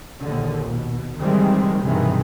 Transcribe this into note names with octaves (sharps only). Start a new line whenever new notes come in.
A#1 D#2 D3
B2
C3 D#3 E3 G3 G#3 C4
B1 G2 C3 D#3 E3 G#3